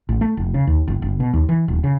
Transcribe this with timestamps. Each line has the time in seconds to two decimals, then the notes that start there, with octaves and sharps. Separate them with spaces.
0.09 A1
0.21 A3
0.37 F1
0.54 C#3
0.67 D#2
0.88 F#1
1.02 F#1
1.20 B2
1.34 D#2
1.49 E3
1.68 D#1
1.84 C#3